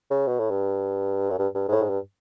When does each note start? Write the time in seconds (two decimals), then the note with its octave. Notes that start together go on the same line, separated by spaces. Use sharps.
0.11 C#3
0.28 B2
0.40 A2
0.51 G2
1.30 F#2
1.39 G2
1.55 G2
1.68 G#2
1.72 A2
1.80 G#2
1.90 G2